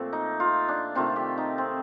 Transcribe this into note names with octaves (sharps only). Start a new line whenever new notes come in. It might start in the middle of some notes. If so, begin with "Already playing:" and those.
Already playing: A#2 F3 A3 C4 A4 F5
D#4
F4
D4
C3 D#3 A3 F4
G4
D#4
C4